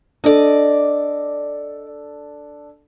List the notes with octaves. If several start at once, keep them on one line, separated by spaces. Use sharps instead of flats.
D4 A4 D5 D#5